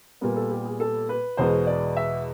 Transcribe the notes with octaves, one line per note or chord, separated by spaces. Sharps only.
A#2 G3 B3 A#4
A4
G4
G#4
A4
B4
E2 B2 G#3 B3 C5
D5
E5